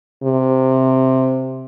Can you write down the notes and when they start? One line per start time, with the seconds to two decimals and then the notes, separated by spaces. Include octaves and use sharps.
0.23 C3